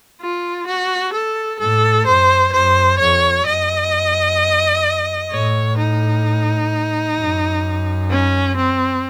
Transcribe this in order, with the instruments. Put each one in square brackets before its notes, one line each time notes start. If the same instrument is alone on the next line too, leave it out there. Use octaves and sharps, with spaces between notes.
[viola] F4
F#4
A4
[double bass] A2 [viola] A4
[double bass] F#2 [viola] C5
[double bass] F#2 [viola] C5
[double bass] F2 [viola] C#5
[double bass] F#2 [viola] D#5
[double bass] A2 [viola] C#5
[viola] D#4
[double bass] F#2
[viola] C#4
C4